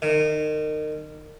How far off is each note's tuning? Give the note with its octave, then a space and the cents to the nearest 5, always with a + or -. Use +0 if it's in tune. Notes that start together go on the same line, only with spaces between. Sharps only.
D#3 -30